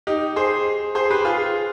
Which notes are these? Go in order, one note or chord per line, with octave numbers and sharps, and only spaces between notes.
D#4 G4
G#4 C5
G#4 C5
G4 B4
F4 G#4